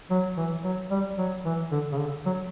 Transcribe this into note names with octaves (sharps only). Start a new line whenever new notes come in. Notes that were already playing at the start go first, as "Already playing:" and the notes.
F#3
E3
F#3
G3
F#3
E3
D3
C#3
D3
F#3